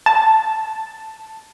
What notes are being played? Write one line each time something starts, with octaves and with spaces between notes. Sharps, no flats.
A5